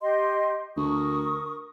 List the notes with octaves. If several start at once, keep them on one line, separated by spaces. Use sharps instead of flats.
G4 D#5 C6
D2 A#4 C#6 D#6